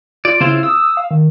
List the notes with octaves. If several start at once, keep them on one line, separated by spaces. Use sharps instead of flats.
F4 D5
C#3 C4 E4 F4
D#6 E6
F5
D#3